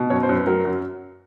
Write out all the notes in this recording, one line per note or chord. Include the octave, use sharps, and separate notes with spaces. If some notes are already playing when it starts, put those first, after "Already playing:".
Already playing: B2
F#2 C#5
C5
F#2
B4
F#3 A#4
F#2